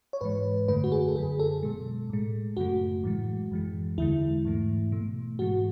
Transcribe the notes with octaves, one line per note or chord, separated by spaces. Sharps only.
C#5
G#2 E3 G#3 B4
F#2 D3 A3 B4
F#4
G#4
A4
F#2 D3 F#3 G#4
A4
B2 G#3
A2 G#3
F#2 C#3 F#3 A3 F#4
A2 E3 G#3
F#2 E3 G#3
E2 D3 G#3 E4
G#2 E3 A3
B2 A3
G#2 E3 G#3 F#4